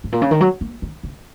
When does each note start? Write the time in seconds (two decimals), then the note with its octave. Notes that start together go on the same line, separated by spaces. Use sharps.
0.04 G#2
0.12 A#2
0.22 C#3
0.31 D#3
0.41 F#3
0.61 A#3
0.82 D#3
1.03 C#3